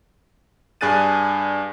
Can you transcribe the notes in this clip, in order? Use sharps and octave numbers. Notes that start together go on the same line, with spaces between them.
G2 D4 G#4 F#6 A6 D#7